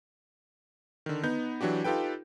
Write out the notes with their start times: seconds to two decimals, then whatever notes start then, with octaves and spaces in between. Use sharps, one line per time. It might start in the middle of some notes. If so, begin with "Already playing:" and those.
1.06 D3 D#3
1.24 B3 D#4 G6
1.61 E3 F#3 D4 F#4 G4
1.84 D#4 F4 G4 A4 B4 G5